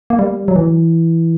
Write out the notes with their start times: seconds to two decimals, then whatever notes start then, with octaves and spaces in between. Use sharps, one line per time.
0.10 A#3
0.19 G3
0.48 F#3
0.56 E3